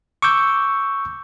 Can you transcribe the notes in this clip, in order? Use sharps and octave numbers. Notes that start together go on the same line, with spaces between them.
C#6 D6 E6 G6